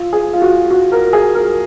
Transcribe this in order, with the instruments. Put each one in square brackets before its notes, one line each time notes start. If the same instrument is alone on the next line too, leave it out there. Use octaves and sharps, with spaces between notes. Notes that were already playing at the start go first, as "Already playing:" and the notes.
Already playing: [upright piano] F4
G#4
F4
F#4
F#4
A#4
G#4
A#4